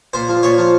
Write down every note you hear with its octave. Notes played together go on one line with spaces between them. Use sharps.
A#2 C5
F3
A#2 C#5
F3